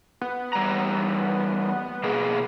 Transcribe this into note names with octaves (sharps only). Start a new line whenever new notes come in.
B3
E2 G3 A#5
B2 A#3 G#4